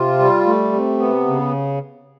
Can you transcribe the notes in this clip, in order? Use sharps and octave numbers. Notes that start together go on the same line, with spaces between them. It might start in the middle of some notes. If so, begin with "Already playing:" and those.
Already playing: C3 F4
G3
A3
C3
B3
C#3